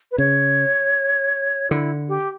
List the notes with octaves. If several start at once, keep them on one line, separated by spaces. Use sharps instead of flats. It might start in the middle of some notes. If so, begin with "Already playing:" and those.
B4
C#3 C#5
D3 E4
G4